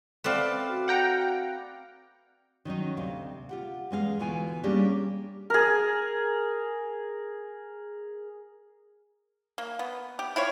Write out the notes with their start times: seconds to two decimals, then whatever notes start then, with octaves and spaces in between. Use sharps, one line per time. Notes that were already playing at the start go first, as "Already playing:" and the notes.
0.24 A3 C4 B4 D5 F5
0.69 F#4
0.88 F#5 G5 A#5
2.65 D#3 F#3 C#4 D#4
2.97 D2 C3 F5
3.49 F4 G4 F#5
3.91 E2 G#3 F#4 F5
4.19 D2 B2 E3 F4 G#5
4.63 G3 A#3 C#4 D4 G4 G#4
5.50 G#4 A#4
9.58 A#3
9.79 B3
10.19 G4
10.36 E4 F4 C#5